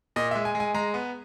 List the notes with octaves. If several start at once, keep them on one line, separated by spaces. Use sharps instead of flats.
A#2 D#5
G#3 E5
G#5
G#3
G#5
G#3 A#5
B3